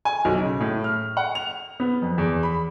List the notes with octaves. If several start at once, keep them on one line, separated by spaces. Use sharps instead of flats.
G#5
B1
C#3
A2
F6
F#5
F7
B3
F2
E2
B5